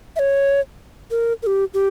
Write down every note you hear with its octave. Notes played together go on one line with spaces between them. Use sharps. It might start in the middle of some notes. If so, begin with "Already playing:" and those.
E5
C#5
A#4
A#4
G4
G4